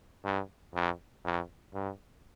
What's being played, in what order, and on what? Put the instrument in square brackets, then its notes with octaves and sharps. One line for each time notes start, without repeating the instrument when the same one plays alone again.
[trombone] G2
F2
F2
G2